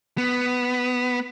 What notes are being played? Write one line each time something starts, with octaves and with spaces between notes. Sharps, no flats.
B3